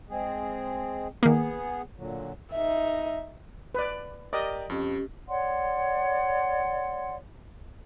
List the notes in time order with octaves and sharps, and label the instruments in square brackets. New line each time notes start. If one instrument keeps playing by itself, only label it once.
[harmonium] G#3 C4 G#4
[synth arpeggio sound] D#3 A#3 [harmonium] B3 G#4
[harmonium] A#2 D3 F#3
[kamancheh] D#4 E5
[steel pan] B4 D5
[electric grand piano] G4 A#4 D5 [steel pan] D#5
[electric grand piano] F2 [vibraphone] C#4 G4
[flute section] C#5 D5 F#5 C6